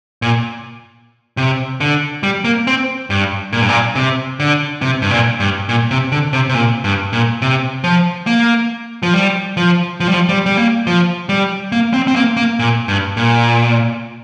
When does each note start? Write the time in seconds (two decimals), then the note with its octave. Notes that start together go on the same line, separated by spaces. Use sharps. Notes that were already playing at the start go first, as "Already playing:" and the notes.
0.22 A#2
1.37 C3
1.80 D3
2.23 G3
2.44 A#3
2.67 C4
3.10 G2
3.53 A#2
3.61 G2
3.69 A#2
3.95 C3
4.40 D3
4.82 C3
5.02 G2
5.11 A#2
5.40 G2
5.69 A#2
5.91 C3
6.12 D3
6.33 C3
6.49 C3
6.54 A#2
6.84 G2
7.13 A#2
7.42 C3
7.84 F3
8.27 A#3
9.03 F3
9.14 G3
9.57 F3
10.00 F3
10.08 G3
10.14 F3
10.29 G3
10.46 G3
10.57 A#3
10.87 F3
11.29 G3
11.72 A#3
11.93 C4
12.08 C4
12.16 A#3
12.37 A#3
12.59 A#2
12.88 G2
13.17 A#2